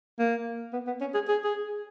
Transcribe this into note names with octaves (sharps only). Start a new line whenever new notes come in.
A#3
B3
B3
C#4
G#4
G#4
G#4